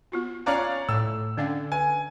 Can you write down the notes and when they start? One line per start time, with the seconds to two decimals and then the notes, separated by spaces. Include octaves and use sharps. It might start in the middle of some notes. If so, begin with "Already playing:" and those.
0.12 B3 F4 F#4
0.46 C#4 C#5 D5 F5 A5 A#5 F#6
0.89 A2 E6
1.37 D3 C#4 D4 F5
1.72 B4 G#5